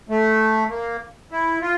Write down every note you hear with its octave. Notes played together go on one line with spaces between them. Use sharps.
A3
A#3
E4
F4